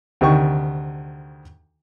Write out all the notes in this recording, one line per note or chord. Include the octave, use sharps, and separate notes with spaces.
D2 C3 D#3 C#6